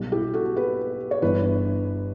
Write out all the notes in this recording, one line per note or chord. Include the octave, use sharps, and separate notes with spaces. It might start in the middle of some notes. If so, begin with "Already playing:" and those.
Already playing: B1 B2 G3
E4 G4
F#4 A4
G4 B4
C#5
G1 G2 E3 G3 G4 B4